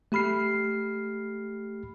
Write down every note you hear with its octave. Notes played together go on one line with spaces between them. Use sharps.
A3 G4 B5 F6 C7